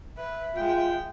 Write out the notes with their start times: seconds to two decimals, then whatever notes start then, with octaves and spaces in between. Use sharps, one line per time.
0.17 B4 E5
0.56 G#3 F4 G5